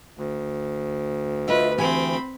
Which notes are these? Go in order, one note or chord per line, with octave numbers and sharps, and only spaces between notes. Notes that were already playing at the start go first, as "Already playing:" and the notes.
D2
F4 B4 D#5 E5
E3 C4 G4 G#5 B5